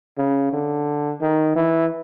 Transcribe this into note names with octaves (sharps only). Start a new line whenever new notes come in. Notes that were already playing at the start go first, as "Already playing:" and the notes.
C#3
D3
D#3
E3